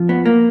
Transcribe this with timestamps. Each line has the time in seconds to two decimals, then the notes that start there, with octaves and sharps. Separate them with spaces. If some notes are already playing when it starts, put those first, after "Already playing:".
Already playing: F2 F3
0.09 B3
0.26 A#3